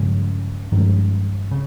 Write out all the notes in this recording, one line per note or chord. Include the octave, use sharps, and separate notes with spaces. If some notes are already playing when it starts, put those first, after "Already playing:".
Already playing: G2 C#3 F3 G#3 C#4
G2 D#3 F3 G#3 C#4
C#3 C#4